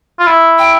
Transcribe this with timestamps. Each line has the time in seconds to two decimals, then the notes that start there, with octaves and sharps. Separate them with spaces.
0.19 F4
0.27 E4
0.59 G5